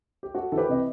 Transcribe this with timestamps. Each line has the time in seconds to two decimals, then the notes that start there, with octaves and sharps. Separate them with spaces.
0.23 G4
0.35 A3 F#4 A4
0.52 E3 A4
0.58 G4 B4
0.69 C3 D#5